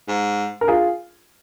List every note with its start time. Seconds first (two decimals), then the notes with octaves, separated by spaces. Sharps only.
0.08 G#2
0.61 A#4
0.68 F4 G#4